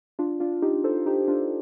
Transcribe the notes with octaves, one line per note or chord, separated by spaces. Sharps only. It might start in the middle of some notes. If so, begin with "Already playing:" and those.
D4 F4
D4 F4
D#4 G4
A4 C5
D#4 G4
D4 F4